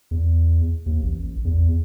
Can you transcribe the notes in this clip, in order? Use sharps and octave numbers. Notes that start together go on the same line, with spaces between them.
E2
D#2
A1
E2